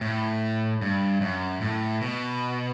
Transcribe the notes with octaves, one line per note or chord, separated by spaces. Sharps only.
A2
G2
F#2
A2
B2